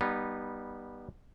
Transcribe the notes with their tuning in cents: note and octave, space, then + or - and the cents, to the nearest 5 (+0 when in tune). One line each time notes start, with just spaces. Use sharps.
G3 +0 B3 -20 D#4 -15